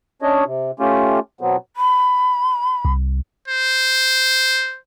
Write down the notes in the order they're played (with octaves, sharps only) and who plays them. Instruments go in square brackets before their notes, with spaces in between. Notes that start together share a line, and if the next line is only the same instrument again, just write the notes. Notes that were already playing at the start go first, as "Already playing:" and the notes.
[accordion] C#4 D4 C#5 D#5
C3
A3 C#4 F4 G4
B2 F#3 B3 C4
[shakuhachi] B5
[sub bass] C2
[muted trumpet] C5